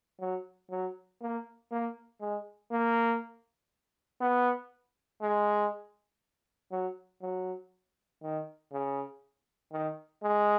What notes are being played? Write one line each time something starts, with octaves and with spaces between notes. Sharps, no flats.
F#3
F#3
A#3
A#3
G#3
A#3
B3
G#3
F#3
F#3
D#3
C#3
D#3
G#3